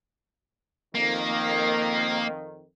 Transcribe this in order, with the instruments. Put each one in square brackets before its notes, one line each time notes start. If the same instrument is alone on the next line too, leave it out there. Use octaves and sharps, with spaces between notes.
[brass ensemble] F2 D#3 [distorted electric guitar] A#3